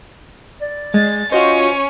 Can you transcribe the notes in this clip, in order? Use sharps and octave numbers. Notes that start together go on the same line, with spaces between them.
D5
G#3 A6
C#4 F4 F#4 C5 D#5